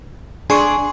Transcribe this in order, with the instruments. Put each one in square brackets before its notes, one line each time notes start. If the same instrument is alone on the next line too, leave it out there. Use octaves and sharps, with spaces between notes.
[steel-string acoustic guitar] D4 G#4 D5 [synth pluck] G#5 C6 C#6